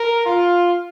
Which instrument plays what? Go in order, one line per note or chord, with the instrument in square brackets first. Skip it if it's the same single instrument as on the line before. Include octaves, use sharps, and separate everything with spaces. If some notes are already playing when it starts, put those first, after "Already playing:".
Already playing: [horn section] A#4
F4